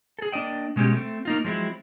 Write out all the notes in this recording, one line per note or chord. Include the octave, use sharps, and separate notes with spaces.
G#4 A4
A#3 D4 D5 D#5 G5
B2 G#3 C#4 F#4 G4
A3 C4
A#3 D#4 F4
F3 F#3 G#3 C4 E4